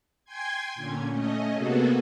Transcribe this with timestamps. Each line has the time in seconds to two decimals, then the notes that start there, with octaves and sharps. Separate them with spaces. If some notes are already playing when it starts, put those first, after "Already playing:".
0.25 G5 G#5 C6 G#6
0.75 A#2 D3 C#4
1.09 A3 C#4 D#5
1.55 C3 A#3 B3 F#4 G#4 A4